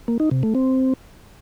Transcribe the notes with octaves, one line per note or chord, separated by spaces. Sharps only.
A#3
D#4
C3
A3
C4